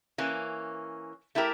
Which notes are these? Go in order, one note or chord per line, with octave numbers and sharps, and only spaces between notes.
E3 A#3 C#4
A3 E4 G4 A#4